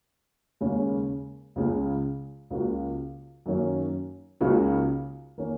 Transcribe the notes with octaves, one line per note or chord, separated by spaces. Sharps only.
D#2 C#3 G#3 C#4
C#2 C#3 G#3
C#2 C#3 A#3 F#4
F#2 D#3 A#3 C#4
C#2 C#3 A#3 D#4 F#4
D#3 A#3 C#4